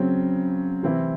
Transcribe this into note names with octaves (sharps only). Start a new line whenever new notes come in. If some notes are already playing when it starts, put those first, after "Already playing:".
Already playing: C#3 F#3 C4
C3 E3 C4 E4